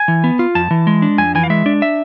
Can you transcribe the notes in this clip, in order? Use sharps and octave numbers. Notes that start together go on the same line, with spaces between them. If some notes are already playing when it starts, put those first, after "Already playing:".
Already playing: G#5
E3
B3
F4
F2 A5
E3
G#3
D4
F2 G#5
E3 G#5
F5
G#3 E5
D4
E5